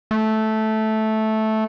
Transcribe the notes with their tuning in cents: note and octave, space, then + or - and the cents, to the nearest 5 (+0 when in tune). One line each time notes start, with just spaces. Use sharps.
A3 -10